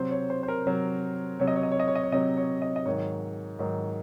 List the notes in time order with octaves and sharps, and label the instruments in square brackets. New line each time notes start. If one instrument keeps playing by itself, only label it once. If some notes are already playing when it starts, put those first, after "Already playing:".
Already playing: [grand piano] C3 F#3 C5
C#5
C5
C5
A#4
C3 F#3
C3 F#3 C#5
D#5
C#5
D#5
C#5
D#5
C#5
D#5
C#5
C3 F#3 D#5
C#5
D#5
D#5
G#2 D#3 F#3 C#5
G#2 D#3 F#3